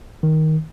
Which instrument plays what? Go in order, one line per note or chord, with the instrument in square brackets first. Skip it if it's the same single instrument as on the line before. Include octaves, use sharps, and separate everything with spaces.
[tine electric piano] D#3